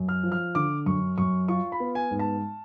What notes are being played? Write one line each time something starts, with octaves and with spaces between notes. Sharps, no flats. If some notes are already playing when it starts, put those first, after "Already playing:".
Already playing: F#2
F6
F3
F6
D3 D6
F#2 C#6
F#2 C#6
F4 C#6
B5
B3
G#5
G#2
A5